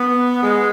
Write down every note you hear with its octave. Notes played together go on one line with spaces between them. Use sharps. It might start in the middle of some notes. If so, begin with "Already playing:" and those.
Already playing: B3
G#3